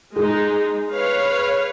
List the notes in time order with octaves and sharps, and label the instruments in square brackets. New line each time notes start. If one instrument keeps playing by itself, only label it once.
[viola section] G#3 D#4 [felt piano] G#4
[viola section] B4 C#5 F5